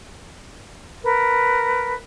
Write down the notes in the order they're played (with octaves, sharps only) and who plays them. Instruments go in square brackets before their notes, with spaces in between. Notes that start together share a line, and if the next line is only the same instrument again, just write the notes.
[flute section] A#4 B4